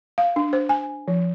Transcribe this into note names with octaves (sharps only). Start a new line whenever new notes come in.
F5
D4
C5
G#5
F3